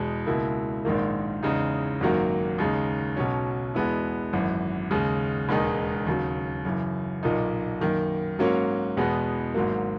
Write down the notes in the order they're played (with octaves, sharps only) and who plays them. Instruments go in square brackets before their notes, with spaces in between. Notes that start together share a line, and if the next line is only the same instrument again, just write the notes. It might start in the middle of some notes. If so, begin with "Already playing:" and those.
Already playing: [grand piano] E2 B2 G#3
C#2 B2 A#3 E4
A#1 G#2 D#3 A#3
E2 C#3 G#3 D#4
G#1 F#2 D#3 F#3 A#3
D#2 C#3 G#3 D#4
B1 B2 F#3 C#4
E2 B2 G#3 B3 E4
G#1 F#2 E3
D#2 C#3 G#3
E1 D#2 D#3 G#3 D#4
D#2 C#3 F#3
F#2 C#3 E3
B1 A#2 A#3 D#4
F#2 D#3 A#3
G#2 F#3 A#3 C#4
E2 B2 G#3 B3
G#1 G#2 F#3 A#3